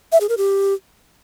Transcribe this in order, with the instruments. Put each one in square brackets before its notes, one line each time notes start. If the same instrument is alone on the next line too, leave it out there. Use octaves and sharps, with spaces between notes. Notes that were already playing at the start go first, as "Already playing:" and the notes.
[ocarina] E5
G#4
A#4
G4